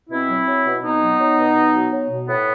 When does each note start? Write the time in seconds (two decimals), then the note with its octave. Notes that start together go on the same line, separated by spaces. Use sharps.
0.10 B2 C4 E4
0.29 F#3
0.47 F#3
0.65 B2
0.83 B2 B3 D#4
1.02 F#3
1.20 F#3
1.38 B2
1.56 B2
1.74 F#3
1.93 F#3
2.10 B2
2.28 A2 B3